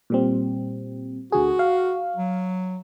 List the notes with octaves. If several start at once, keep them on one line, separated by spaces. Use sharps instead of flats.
A#2 G3 C4
D2 D3 F#4 G#4
F5
F#3